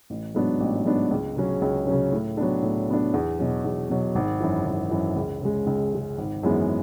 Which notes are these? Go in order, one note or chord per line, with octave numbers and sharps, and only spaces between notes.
A1
G#2 F#3 B3 D4
A1
G#2 F#3 B3 D4
C#2
C#3 F#3 C#4
C#2
C#3 F#3 C#4
A2
F#3 B3 D4
A2
F#3 B3 D4
E2
B2 F#3
E2
B2 F#3
G#1
F#2 E3
G#1
F#2 E3
C#2
C#3 G#3
C#2
C#3 G#3
G#1
F#2 E3 G#3 B3